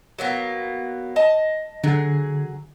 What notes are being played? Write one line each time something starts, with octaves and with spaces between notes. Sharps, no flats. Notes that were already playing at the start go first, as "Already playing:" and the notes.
F#3 A#3 B3
D#5 A5
D3 F#3 G#4